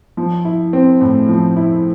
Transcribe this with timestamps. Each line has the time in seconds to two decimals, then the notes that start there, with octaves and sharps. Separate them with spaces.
0.17 F3
0.45 E4
0.73 C4
1.01 A2
1.29 F3
1.57 E4